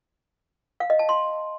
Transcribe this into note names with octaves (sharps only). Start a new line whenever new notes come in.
F5
D#5
A5
C6